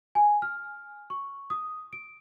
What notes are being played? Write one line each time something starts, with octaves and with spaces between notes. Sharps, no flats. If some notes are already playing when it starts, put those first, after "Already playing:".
G#5
F6
C#6
D#6
D7